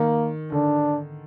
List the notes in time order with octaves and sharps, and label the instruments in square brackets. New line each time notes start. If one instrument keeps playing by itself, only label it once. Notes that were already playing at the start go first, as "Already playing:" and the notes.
Already playing: [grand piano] D#3 [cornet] A#3
[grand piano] D3 [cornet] D4